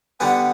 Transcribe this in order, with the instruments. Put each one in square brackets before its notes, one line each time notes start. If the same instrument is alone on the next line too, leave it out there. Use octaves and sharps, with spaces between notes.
[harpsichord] D3 G3 B3 [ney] F#5 G#5